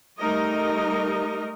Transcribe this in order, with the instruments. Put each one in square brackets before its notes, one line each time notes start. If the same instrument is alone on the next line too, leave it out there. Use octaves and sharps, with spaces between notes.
[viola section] G3 A3 D#4 A#4 D#5